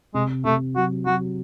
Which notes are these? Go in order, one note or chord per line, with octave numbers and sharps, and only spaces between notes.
C3 G#3
C3 A3
F#3 F#4
F#3 F#4